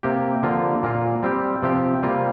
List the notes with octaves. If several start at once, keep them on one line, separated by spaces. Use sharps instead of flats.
C3 A#3 G4
D3 F3 A#3 F4
A#2 A#3 F4
G3 C4 G4
C3 F3 C4 G4
C3 G3 A#3 F4